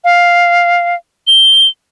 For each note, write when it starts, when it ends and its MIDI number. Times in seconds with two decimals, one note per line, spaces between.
0.04 0.95 77
1.27 1.68 103